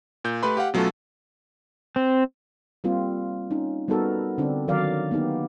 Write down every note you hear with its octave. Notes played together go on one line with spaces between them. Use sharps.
A#2 G6
A3 G4 B4 B5 C6
G4 F5 F#5
B2 F#3 A3 C#4 F4 A4
C4
G3 A#3 C4 F4
C#4 D#4
G3 B3 D#4 F#4 A4 A#4
D3 C4 D4
D#3 F#3 A#4 D5 F5
A#3 B3 D#4 G4